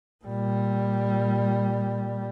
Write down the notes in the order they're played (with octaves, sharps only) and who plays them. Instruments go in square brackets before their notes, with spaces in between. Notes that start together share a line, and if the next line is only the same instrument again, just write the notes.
[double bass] A#2 G3